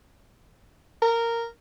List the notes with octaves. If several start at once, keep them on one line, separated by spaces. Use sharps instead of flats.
A#4